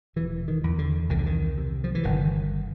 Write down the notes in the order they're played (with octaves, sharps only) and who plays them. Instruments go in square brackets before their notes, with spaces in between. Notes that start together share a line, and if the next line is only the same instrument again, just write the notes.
[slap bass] E1 E3
D#3
E2
D3
C2 D#3
D3
D#3
C3
F3
E3
G1 D#3